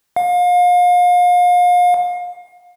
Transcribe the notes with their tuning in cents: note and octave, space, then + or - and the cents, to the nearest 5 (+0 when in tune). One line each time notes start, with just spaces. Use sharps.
F5 +35